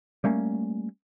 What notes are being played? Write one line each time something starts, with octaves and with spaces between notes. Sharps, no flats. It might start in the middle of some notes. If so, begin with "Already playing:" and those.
G3 A3 A#3 C#4